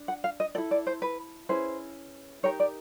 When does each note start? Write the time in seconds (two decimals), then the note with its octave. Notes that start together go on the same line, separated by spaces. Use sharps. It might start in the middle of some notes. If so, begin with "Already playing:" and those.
Already playing: D4
0.08 F#5
0.24 F5
0.40 D#5
0.55 E4 A4 D5
0.71 D5
0.87 C5
1.02 B4
1.49 C#4 E4 G#4 B4 C5
2.43 D#4 G4 A#4 C#5
2.60 D5